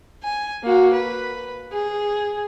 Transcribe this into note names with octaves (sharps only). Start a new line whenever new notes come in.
G#5
A#3 F#4
B4
G#4